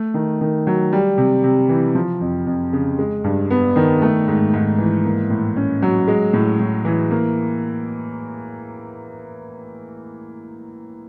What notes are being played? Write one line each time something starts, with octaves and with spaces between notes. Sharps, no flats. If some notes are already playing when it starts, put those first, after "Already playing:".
Already playing: A3
D#3
D#3
F#3
G3
C3
C3
E3
F3
F2
F2
C#3
G#3
G2
B3
D#3
A3
G#2
G#2
E3
A#3
A2
C#4
F#3
G#3
A2
A2
E3
A#3